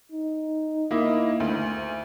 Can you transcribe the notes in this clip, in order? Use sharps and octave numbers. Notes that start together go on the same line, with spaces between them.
D#4
A#3 E4 D#5
D2